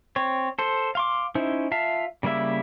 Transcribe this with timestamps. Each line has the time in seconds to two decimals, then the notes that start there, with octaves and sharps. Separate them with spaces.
0.16 C4 C#5
0.59 A4 C5
0.95 F5 C6 D6
1.35 C#4 D#4 E4 C5
1.72 F4 E5 F5 A5
2.23 C#3 G3 A#3 E4 E5